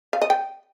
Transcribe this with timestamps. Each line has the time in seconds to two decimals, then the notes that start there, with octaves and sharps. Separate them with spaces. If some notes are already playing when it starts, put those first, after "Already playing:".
0.13 F5
0.22 D#5
0.30 G5